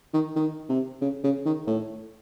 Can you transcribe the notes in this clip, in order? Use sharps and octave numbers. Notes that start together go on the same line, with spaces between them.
D#3
D#3
C3
C#3
C#3
D#3
A2